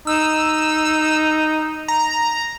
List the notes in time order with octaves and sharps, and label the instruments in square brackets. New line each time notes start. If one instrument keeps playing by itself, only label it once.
[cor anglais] D#4 [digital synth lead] E6
[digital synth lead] A#5